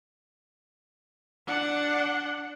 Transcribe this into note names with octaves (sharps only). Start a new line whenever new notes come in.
D4 F#5